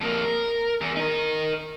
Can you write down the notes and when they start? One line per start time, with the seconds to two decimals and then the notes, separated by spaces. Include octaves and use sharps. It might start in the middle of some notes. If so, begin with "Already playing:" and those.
0.01 F2 A#3
0.24 A#4
0.81 E2
0.96 D#4 A#4